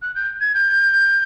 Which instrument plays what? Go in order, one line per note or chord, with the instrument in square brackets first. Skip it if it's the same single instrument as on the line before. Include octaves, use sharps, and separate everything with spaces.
[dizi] F#6
G6
G#6
G6